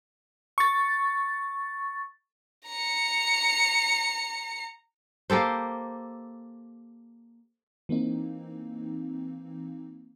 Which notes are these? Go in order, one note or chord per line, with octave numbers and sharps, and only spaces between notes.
C#6 A6
A#5 C#7
A#3 G4 A4 C5
E3 A#3 C4 D#4